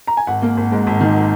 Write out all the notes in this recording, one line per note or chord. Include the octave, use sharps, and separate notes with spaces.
A#5
G#5
G#1 F#5
A#3
G#1
G#2
G#1
D#3